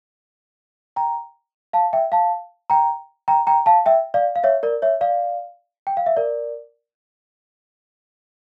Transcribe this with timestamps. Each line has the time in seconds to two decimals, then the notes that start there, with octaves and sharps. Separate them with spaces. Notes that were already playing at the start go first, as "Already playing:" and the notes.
0.96 G5 A#5
1.73 F5 A5
1.93 E5 G5
2.12 F5 A5
2.70 G5 A#5
3.28 G5 A#5
3.47 G5 A#5
3.66 F5 A5
3.86 E5 G5
4.14 D5 F5
4.36 F5
4.44 C#5 E5
4.63 A#4 D5
4.82 C#5 E5
5.01 D5 F5
5.87 G5
5.97 F5
6.06 E5
6.17 A#4 D5